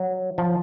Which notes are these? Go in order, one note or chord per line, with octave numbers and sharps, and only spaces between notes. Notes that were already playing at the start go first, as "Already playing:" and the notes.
Already playing: F#3
F3